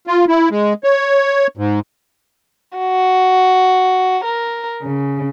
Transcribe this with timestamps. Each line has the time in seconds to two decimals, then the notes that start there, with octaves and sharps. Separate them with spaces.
0.07 F4
0.28 E4
0.51 G#3
0.84 C#5
1.57 G#2
2.78 F#4
4.26 A#4
4.82 C#3